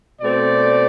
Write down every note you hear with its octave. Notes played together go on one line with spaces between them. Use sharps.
B2 A3 C4 D5